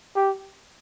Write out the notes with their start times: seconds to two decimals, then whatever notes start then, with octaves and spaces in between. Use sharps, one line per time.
0.15 G4